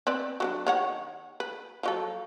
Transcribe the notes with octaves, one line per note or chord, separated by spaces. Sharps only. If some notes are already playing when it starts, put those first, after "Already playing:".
C4 B4 D5
F#3 B3 D4
D#3 C#5 F#5
B4
F3 F#3 A4